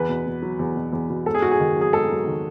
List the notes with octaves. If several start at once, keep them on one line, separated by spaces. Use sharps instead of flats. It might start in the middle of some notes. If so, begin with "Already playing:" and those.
Already playing: E2 B4
B2
B2
F#3
E2
B2
E2
B2
G#2 A4
G#4
G#2 F#4
G#4
D#3
F#3 G#4
G#2 A4
F#3
D#3